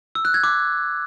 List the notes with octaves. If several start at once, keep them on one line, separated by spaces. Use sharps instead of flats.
E6
F#6
G#6
D6